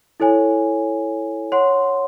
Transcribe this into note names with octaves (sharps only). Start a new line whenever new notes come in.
E4 A4 C#5 G#5
C#5 F#5 C6